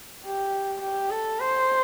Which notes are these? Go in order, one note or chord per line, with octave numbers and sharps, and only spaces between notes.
G4
G4
A4
C5